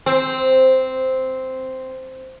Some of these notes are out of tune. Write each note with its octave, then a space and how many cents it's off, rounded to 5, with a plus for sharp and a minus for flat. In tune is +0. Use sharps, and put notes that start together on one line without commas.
C4 -5